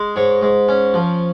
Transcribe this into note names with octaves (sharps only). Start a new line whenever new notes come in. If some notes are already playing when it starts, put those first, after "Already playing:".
Already playing: G#3
G#2 C#5
G#2
C#4
F3